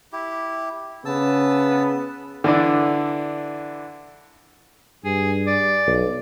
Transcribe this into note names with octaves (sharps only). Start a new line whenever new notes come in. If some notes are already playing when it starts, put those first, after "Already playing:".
E4 G4
C#3 B3 A5 E6
D3 E3 D4
G2 G#4
D5
B1